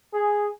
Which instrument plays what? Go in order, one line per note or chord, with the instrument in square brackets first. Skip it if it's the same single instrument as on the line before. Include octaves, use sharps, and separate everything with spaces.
[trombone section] G#4